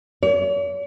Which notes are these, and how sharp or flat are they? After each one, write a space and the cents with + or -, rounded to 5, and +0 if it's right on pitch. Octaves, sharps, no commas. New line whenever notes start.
C#5 +40